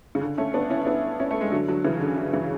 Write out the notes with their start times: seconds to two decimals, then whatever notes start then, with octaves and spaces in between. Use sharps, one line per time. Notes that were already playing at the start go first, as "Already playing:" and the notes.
0.15 C#3
0.21 D3
0.38 A3 C#4
0.54 B3 D4
0.70 C#4 E4
0.81 E4
0.86 B3 D4
1.19 C#4 E4
1.31 A3
1.41 G#3
1.52 D3 F#3
1.68 D3 F#3
1.84 C#3 E3
2.01 D3
2.17 D3
2.33 C#3 E3